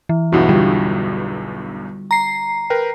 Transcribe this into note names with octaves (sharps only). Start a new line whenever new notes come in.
E3
B1 E2 G2 E4 F#4
D3 G3 B3 F4
A#5 C7
A#4 B4 G5